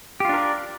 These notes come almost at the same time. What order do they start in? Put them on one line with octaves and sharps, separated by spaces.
G4 F4 D4 A#4 D5